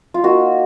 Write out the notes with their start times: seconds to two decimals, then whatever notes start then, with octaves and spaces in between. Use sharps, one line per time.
0.14 F4
0.23 A#3 D#4 F#4